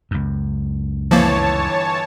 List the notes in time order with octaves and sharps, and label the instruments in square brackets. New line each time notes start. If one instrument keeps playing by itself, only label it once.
[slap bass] C#2 F#2
[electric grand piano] G1 E3 [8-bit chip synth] F3 A#3 [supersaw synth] C#5 A5